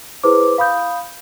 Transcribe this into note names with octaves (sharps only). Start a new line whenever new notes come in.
E4 G#4 B4 C5 D6
F5 B5 D#6 G6